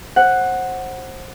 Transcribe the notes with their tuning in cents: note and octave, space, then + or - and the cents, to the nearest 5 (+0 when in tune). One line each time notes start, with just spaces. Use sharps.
C5 +25 F#5 +0